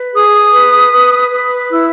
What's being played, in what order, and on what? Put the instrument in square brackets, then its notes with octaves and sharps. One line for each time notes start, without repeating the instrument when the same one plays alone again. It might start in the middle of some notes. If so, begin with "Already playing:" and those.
Already playing: [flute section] B4
G#4 D#6
B4
B4
B4
E4 E6